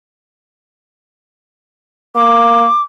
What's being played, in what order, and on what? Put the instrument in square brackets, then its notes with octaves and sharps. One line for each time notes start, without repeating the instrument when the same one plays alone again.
[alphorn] A#3 [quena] D6